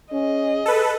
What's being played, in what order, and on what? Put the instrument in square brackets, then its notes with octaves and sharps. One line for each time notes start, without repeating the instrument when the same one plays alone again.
[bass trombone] C#4 [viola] G#4 D#5
[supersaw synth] A4 B4